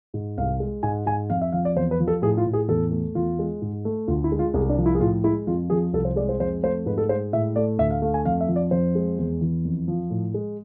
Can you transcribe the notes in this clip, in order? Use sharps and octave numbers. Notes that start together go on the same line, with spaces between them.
G#2
C2 F5
G#3
G#2 G#5
G#2 G#5
F2 F5
E5
F3 F5
D5
E2 C5
B4
F3
A4
A2 G#4
F4
A2
G#4
E2 A4
A3
E2 F4
G#3
G#2
A3
D2 F4
E4
G#3
F4
C2 G#4
D4
F3
E4
G#4
A2 F4
G#3 E4
F2 F4
F3 G#4
C2 A4
C5
G#3 D5
C5
F2 C5
A3 C5
G#2 B4
A4
G#3 C5
A2 E5
A3 D5
D2 E5
F5
A3 F5
G#5
F2 F5
E5
F3
D5
F2 C5
G#3
E2
E3
F2
F3
A2
G#3